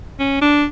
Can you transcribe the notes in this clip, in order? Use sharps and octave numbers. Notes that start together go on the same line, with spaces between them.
C#4
D4